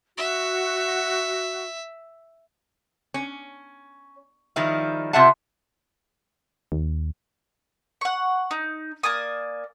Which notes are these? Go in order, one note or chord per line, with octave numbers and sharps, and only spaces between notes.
F#4 E5
C#4
D#3 F3 G3 D#4 E4
C3 F4 C5 E5 F#5 A5
D#2
F#5 C#6
D#4
A#3 D5 G#5 D#6